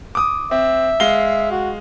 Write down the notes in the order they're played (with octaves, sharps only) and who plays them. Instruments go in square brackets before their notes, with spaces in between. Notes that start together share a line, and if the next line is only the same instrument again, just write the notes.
[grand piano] D6 D#6
[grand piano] C4 [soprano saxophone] E5
[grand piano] G#3 F5 G7
[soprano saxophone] F#4